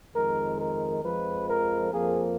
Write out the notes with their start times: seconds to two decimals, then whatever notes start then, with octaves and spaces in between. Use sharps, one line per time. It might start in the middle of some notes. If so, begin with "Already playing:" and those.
0.14 F2 D#3 G#3 A#4
0.59 A#4
1.03 F2 F3 G#3 B4
1.48 A#4
1.91 F2 F3 A#3 G#4